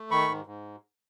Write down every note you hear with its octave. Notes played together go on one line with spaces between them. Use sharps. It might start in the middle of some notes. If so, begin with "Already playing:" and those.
Already playing: A3
D#3 B5 C#6
G#2
G#2